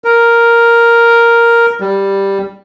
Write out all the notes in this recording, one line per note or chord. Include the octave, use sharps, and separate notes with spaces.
A#4
G3